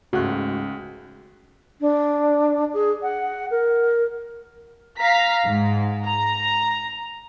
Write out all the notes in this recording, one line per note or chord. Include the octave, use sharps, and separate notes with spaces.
C#2 G#2 A3 C#4 F#4 F#6
D4
G#4
F#5
A#4
F5 A#5 B6
G#2
A#5